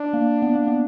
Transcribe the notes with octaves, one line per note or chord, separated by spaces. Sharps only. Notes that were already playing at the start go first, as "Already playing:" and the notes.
Already playing: D4
A#3
B3
A#3
B3